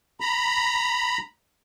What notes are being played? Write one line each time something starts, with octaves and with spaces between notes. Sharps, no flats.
A#5 B5